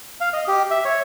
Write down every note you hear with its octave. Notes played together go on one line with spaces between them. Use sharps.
F5
D#5
G4
E5
C#5